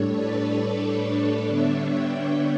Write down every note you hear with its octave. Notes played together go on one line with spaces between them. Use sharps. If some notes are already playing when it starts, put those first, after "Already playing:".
Already playing: A2 G3 D4 A4 C#5
B4 D5
B4 D5
B4 D5
D3 G3 B3 D4 C#5 E5
E5 G5